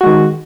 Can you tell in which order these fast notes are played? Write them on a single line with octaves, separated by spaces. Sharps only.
F#4 G#3 D#3